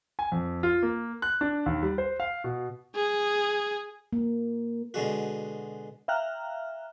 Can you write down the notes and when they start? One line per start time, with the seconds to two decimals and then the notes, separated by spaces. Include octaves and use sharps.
0.19 G#5
0.32 F2
0.63 F4
0.83 A#3
1.22 F#6
1.41 D4
1.66 D#2
1.83 G3
1.98 C5
2.20 F5
2.44 B2
2.95 G#4
4.13 A#3
4.94 B2 D3 G#3 F#4
6.08 E5 F5 G5 A#5 F6 F#6